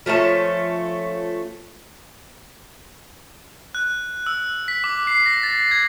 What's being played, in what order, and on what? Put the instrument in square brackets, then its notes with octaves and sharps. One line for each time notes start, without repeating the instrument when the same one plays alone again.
[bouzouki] F3 A3 C#4 A5
[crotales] F#6
E6
B6
D6
C7
A#6
A6
G#6